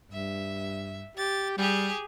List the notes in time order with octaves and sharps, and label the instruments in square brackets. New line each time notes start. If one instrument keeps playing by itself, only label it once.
[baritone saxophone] G2 [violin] E5
[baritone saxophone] G4 [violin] A6
[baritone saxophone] G3 [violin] G4 G#4